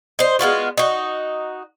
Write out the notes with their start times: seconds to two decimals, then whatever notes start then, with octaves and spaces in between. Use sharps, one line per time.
0.19 D#4 C5
0.39 G#3 B3 F4 F#4
0.78 D#4 F#4